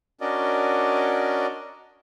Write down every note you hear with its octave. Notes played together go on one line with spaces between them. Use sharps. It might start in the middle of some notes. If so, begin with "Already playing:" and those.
C#4 D4 F#4 A#4 D5 D#5